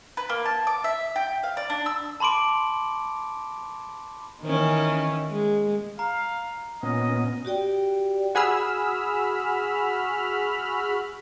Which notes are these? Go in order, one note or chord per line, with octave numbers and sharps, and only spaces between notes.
B4
A#3
A5
D6
E5
G5
F5
D5
D4
E6
A5 B5 C6 D6 D7
D#3 E3 C#4
G#3
F5 A#5
A#2 B3 C#4 D#5
F#4 G4 D5 G5
F#4 G#4 B5 E6 F6